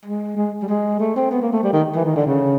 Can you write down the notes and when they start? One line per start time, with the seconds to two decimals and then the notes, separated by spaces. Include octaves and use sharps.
0.05 G#3
0.37 G#3
0.62 G3
0.68 G#3
1.00 A3
1.16 C4
1.31 B3
1.41 A#3
1.53 A3
1.63 G3
1.73 D#3
1.95 E3
2.05 D#3
2.16 D3
2.26 C#3